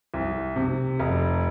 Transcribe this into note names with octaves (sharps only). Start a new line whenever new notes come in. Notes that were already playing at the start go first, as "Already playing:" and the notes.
C2
C3
F1